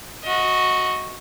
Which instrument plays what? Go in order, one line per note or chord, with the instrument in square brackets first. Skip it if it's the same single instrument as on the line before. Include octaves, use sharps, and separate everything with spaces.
[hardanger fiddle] F#4 D#5